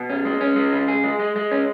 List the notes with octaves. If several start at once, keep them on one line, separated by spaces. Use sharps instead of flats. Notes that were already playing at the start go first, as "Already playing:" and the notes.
Already playing: B2
C#4
G#3
C#4
G#3
C#3
G#4
G#3
G#3
G#3
C#4